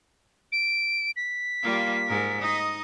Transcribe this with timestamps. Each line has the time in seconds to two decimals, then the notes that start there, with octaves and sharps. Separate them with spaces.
0.52 D7
1.16 B6
1.62 G3 A#3 F4
2.07 G#2 A#4
2.41 D#4 D#5